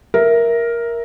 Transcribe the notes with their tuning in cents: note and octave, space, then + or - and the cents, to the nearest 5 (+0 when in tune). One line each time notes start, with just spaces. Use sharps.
A#4 +5 E5 +0